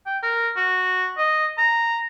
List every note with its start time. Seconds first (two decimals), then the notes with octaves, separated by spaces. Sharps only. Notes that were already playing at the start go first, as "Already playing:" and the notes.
0.06 G5
0.23 A#4
0.56 F#4
1.17 D#5
1.58 A#5